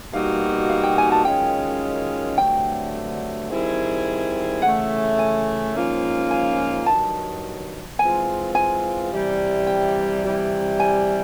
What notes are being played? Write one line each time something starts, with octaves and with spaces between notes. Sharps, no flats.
B2 G3 A#3 D#4 F#4 F5
F5
G5
G#5
A5
F#2 D#3 G#3 C#4 F4 G5
G2 D3 F#3 A3 C4 G5
D#3 G3 C4 E4 G#4
C#3 E3 A3 F#5
G#5
G#2 F3 A#3 C#4 F4
G#5
G2 D#3 F#3 A5
E3 G#3 C4 F4 G#5
G#5
C3 E3 G3
G5
C3 E3 G3
G#5